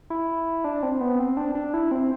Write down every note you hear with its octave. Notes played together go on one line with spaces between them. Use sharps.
E4
D4
C4
B3
C4
D4
D4
E4
C4